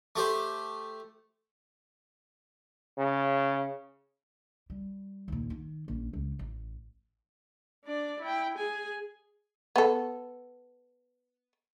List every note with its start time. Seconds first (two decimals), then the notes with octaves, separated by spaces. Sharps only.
0.16 A3 G4 C5
2.98 C#3
4.70 G3
5.28 D#2 A#2
5.50 D#3
5.88 A#1 C#4
6.13 C#2
6.39 A1
7.85 D4 D5
8.21 E4 G5
8.58 G#4 G#5
9.76 B3 A4